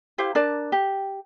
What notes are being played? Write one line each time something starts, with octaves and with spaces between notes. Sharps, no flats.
E4 G4 C5 F5
D4 A#4 D5 A5
G4